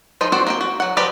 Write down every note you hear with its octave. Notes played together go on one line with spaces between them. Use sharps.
E3 F3 D#4 F4
C4 D4 F#4 C5
A#3 D#5 G5
F#4
F#3 F#5
F3 G4 B4 D5 A#5